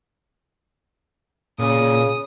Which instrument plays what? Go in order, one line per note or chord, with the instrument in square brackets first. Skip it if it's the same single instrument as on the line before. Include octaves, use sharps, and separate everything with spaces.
[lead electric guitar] A#2 [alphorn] C#3 [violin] D#6